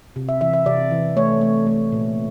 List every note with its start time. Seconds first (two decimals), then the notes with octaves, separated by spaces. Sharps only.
0.16 C3
0.29 E5
0.41 E3 E5
0.54 E5
0.66 C3 D5
0.91 E3
1.17 A3 C#5
1.41 A3
1.67 A3
1.92 A#2